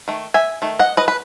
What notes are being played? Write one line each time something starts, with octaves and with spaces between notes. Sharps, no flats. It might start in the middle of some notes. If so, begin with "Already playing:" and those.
D#3 A3
E5 G#5
D#3 A3
D#5 F#5
B4 D#5
B4